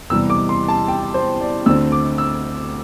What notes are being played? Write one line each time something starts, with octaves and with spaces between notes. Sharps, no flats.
E2 C3 E3 G3 E6
D6
C6
A5
G5
C5
D5
D2 D3 C4 E6
D6
E6